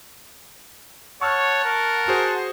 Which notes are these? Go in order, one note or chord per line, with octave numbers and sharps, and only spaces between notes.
C#5 F#5 A5 C#6 E6 F6
A#4
F#4 G#4 C5